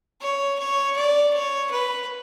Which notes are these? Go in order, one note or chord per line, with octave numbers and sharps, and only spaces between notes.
C#5
C#5
D5
C#5
B4